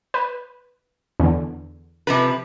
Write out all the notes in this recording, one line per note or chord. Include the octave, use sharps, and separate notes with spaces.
B4
E2 D3
C3 F3 B4